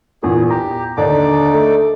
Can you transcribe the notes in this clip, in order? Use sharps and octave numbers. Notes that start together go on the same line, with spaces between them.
E2 A#2 G#4
G4 A#5
D#2 D3 D4 D#4 D5 D6
A3